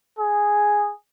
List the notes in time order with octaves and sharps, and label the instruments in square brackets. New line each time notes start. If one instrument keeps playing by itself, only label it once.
[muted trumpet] G#4